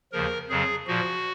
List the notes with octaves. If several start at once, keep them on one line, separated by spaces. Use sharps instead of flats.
D#2 C#3 F3 A#4
F2 C#3 F#3 G#4
A#2 F3 F#4